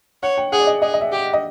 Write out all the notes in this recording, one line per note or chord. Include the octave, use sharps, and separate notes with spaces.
C#5 F#5
G5
G#4 F#5
D5
D#5
G#4 D#5
D#5
E5
G4
D#5